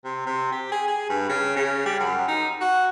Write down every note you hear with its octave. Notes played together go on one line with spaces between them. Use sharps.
C3
C3
G4
G#4
G#4
G2
C#3
C#3
G3
F#2
D#4
F#4